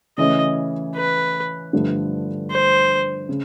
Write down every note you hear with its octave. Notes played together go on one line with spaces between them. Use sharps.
C#3 E3 A3 C#4 D#5
B4
G2 D3 F3 A3
C5
C#3